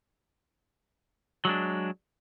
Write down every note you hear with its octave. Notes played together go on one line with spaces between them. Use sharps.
F#3 G#3 D4